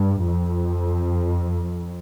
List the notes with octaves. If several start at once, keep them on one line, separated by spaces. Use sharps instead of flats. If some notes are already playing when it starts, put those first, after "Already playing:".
Already playing: G2
F2